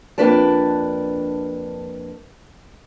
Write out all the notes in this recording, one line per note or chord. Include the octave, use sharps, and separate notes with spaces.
F2 A#3 D4 B4 D5 A5